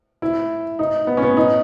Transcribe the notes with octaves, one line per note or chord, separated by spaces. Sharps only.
E4
D#4
B3
C#4
B3
D#4